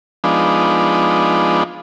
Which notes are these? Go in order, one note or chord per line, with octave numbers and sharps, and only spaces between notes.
F3 G#3 B3 D4 D#4